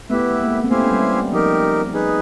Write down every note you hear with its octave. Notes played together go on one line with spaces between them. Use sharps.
A3 B3 E4 G4 B4 E5
A3
A3
G#3 A#3
C4
A3 B3 E4 G4 C5 F5 G#5
B3 C#4
G3
F3 D#4 G4 A#4
D#4 G#4 B4